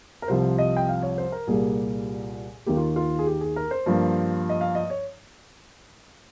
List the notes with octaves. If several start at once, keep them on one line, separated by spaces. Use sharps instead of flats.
A#4
C2 C3 F3 C5
D#5
G5
F5
C#5
C5
A#4
C2 A#2 G3 A#3 G#4
D#2 D#3 A#3 G4
F4
F4
G#4
G4
G#4
A#4
C5
G2 F3 A#3
D#5
F5
D#5
C#5